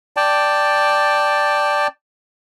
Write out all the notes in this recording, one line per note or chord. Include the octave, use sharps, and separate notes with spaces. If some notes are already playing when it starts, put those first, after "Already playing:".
D5 G5 A5